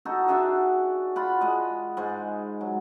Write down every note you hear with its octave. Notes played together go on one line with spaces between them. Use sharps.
D#4 F#4 A4
D4 F#4 G#4 E5
F4 F#5 B5
G#3 D#5
G#2 G#3
F#3